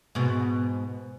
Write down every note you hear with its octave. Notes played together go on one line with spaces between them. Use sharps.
G#2 B2